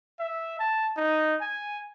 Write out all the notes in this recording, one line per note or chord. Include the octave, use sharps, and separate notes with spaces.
E5
A5
D#4
G#5